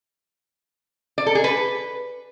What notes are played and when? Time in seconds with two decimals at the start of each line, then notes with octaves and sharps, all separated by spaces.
1.18 D5
1.26 A4
1.35 G#4
1.44 B4